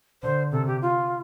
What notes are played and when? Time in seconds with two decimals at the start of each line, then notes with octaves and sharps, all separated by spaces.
0.22 D3 C5
0.52 C3 A4
0.66 G4
0.81 F4